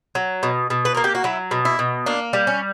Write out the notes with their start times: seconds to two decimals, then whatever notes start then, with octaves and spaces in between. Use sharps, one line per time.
0.15 F#3
0.43 B2
0.70 B2
0.85 B4
0.94 A#3 A#4
1.04 G4
1.15 F#4
1.24 F#3 E4
1.51 B2
1.65 E4
1.79 B2
2.06 A#3 D4
2.33 G3
2.47 C#4